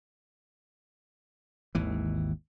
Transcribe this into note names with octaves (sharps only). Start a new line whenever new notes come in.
G#1 D#2 E3